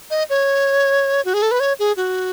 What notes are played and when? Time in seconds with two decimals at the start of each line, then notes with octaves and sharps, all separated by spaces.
0.10 D#5
0.30 C#5
1.25 F#4
1.34 G#4
1.42 A4
1.51 B4
1.60 C#5
1.79 G#4
1.97 F#4